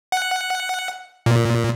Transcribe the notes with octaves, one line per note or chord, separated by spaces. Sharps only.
F#5
A#2